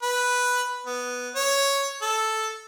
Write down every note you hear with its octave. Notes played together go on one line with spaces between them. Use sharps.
B4
B3
C#5
A4